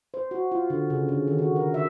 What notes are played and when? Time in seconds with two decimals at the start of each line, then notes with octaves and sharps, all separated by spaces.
0.14 C5
0.31 F#4
0.52 F4
0.70 D3
0.90 C#3
1.09 D3
1.28 D#3
1.39 F#4
1.56 A#4
1.74 E5